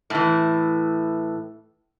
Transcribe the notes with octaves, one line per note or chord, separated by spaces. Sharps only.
A2 E3